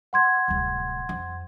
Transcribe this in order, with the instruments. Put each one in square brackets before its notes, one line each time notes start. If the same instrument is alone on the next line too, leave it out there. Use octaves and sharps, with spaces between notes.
[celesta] F#5 C6 G#6
[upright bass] D1 C2
F2